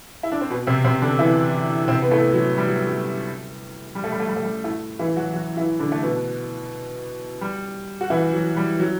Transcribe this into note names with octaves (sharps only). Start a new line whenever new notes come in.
E4
D4
C4
B2 B3
C3 C4
C3 C4
D3 D4
E3 E4
C3 C4
B3
A2 A3
F#3
G3
F#3
F#3
G3
A3
G3
A3
G3
A3
G3
A2 A3
E3 E4
F#3 F#4
F#3 F#4
E3 E4
D3 D4
A3
B2 B3
G3
F#4
E3 E4
F#3
G3
F#3